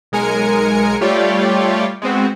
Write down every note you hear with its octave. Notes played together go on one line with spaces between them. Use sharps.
B1 G#3 A#4 G#5 C#7
G3 A3 F4 G4 C#5 D5
G#3 B3 C4 F#4